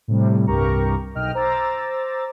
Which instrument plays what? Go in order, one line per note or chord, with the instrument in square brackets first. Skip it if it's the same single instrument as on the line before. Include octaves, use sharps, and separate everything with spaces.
[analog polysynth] A2 C3 G3
C2 G2 G4 A#4 A#5 C#6
B1 D#5 G5 F6
C5 A#5 D6 E6 A6